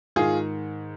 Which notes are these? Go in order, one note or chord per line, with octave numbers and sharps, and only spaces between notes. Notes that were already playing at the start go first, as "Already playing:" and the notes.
G#2 D#3 F4 G#4